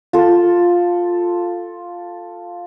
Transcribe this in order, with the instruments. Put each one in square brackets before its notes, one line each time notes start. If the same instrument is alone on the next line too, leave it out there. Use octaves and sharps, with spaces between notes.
[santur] F4 A4